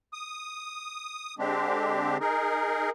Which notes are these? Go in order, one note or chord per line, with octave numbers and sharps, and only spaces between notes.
D#6
D3 G#3 C4 D4 G4
D#4 G#4 A#4